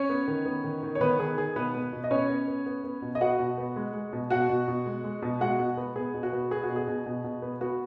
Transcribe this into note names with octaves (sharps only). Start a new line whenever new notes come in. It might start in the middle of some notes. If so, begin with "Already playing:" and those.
Already playing: C#4 C#5
B3
D#3
B3
D#3
D#3
C#5
D#3 B3 B4
D#3 G#4
D#3 G#4
B2 B3 B4
B3
B2
D#5
B3 C#4 C#5
B3
B3
B3
B3
B2
D#5
B3 F#4 F#5
B2
B3
G#3
G#3
B2
B2 F#4 F#5
B2
B2
G#3
G#3
B2
G#3 F#4 F#5
B2
B3
B3 G#4
B2
F#4
B3
B3 G#4
F#4
B2
G#4
B2
B2
B2
B3
B3 F#4